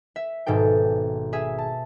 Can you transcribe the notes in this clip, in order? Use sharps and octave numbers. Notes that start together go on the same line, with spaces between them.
E5
G#1 G#2 B2 A4 G5
G#4 E5
A5